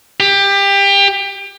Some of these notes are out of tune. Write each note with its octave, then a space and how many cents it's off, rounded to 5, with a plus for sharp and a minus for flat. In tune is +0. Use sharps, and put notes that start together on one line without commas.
G4 +25